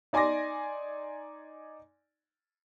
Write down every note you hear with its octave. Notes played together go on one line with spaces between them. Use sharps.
D#4 D5 G#5 C6 D6 A#6